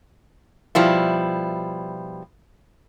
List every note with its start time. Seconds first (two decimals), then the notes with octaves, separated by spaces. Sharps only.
0.75 B2 F3 G3 E4